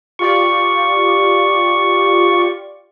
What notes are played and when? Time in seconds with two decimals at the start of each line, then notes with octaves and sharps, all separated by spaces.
0.19 F4 G4 D5 C#6